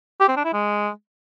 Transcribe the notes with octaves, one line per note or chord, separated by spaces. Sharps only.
G4
C4
D4
E4
G#3